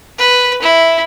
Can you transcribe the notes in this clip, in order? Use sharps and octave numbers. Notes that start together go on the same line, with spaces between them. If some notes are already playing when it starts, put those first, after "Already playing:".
B4
E4